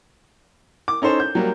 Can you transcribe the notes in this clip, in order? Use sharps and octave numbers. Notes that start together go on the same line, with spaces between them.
D6
C#4 D#4 A4 C5 C#5
G6
F#3 G3 A#3